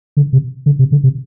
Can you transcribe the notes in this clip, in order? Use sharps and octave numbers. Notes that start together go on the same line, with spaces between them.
D3
C3
D3
C3
D3
C3